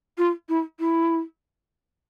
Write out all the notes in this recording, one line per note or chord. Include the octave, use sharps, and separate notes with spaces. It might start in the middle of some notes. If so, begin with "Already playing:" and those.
F4
E4
E4